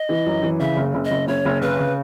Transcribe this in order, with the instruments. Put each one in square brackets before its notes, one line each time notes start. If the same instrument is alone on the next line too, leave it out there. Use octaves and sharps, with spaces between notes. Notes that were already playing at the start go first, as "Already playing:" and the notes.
Already playing: [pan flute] D#5
[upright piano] E3
F#2
E3
[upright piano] C#3 [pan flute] E5
[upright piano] F#1
F#1
[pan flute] D#5
[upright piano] F#1
[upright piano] F#1 [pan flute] C#5
[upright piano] F#1
[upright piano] C#3 [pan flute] B4
[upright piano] C#3